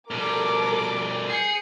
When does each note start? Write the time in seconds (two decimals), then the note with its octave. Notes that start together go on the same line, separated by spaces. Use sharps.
0.11 B2 G3 A4 A#4 D6
1.29 G#4 G6 C7 C#7